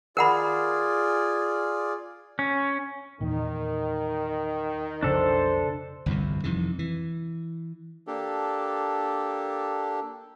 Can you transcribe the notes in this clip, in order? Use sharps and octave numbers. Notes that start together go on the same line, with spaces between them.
F4 G#4 A#4 D5 F#5 B5
C#4
E2 A#2 D#3
B1 F2 C#3 D4 A4 C5
G1 C2 F2 C3
F2 C3 D#3 E3
E3
A#3 D4 G4 A4